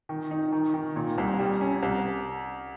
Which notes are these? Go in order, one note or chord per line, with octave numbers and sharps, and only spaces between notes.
D#3
D#4
D#3
D#3
A#2
C2
G3
C#4
C2